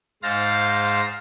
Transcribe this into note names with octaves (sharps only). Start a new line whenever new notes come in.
G#2 C5 F5 A6 A#6